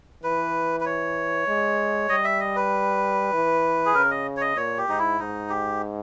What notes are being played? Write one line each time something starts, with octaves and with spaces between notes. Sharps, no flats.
E3 B4
B4
C#5
G#3
G3 D#5
E5
D#5
B4
E3
G#4
C#3 A#4
D#5
C#5
D#5
A#2 C#5
G4
G#2 D#4
E4
G#2 D#4
G4